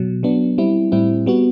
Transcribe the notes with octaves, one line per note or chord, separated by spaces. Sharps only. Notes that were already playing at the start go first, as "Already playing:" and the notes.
Already playing: B2 F#3
F#3 B3 D4
G3 C4 E4
A2 G3 C4 E4
G3 B3 F#4